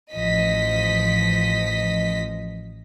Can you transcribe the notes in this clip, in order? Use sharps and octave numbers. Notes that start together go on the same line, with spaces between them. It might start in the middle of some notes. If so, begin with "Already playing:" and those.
A1 F3 D#5 B6